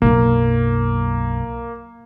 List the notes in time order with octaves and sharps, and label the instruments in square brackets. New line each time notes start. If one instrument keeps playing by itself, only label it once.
[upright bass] B1 F#2 [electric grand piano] A#3